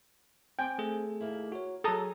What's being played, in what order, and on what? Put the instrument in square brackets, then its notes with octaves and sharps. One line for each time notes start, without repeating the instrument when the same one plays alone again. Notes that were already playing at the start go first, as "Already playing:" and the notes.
[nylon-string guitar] C4 G#5 [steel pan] G5
[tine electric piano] A3 G#4 A4
[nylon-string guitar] D#2 A#3 E4
[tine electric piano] F#4 C#5 [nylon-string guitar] A#4
[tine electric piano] F#3 G#4 [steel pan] A4 A#5 D#6